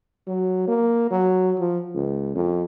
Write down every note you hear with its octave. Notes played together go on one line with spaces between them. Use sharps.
F#3
A#3
F#3
F3
C#2
F2